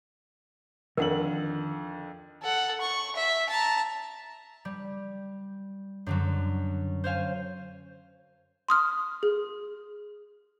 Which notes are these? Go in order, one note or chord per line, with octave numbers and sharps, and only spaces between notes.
F2 D3 D#3 A#4 C#5 F5 F#5 F#7
A4 F#5
C#6
E5
A5 A#5
G3
F#2 D3 F#3
C5 C#5 F5 G#5
C6 D#6 F6
G#4